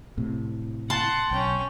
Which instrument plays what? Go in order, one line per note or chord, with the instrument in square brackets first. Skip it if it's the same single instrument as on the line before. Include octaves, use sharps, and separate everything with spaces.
[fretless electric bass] A2 C3
[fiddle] F#5 [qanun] A5 C6
[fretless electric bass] B1 [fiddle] C#4 G5